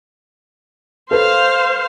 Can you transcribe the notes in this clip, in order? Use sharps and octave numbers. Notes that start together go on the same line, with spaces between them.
A4 B4 C5 F5